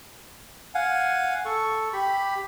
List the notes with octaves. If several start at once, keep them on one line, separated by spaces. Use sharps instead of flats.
F5 F#5 G#5
A4 C#6
G4 B5